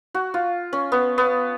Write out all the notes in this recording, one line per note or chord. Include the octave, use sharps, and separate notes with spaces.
F#4
F4
C#4
B3
B3